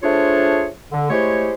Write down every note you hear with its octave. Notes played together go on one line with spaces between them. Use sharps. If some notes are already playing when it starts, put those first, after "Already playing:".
A3 D4 F4 G#4 C5 C#5
D3
G#3 A3 E4 G4 C5 C#5